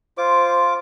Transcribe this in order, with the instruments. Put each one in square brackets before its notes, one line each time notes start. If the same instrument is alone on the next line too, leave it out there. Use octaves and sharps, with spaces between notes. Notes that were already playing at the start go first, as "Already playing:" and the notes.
[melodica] F4 D6 [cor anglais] C5